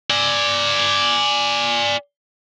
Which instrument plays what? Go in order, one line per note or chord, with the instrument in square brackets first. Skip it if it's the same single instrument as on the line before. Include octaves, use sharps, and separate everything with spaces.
[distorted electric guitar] D5 G#5